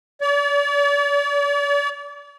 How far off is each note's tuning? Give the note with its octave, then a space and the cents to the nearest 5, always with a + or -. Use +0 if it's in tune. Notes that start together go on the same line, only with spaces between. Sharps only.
D5 -45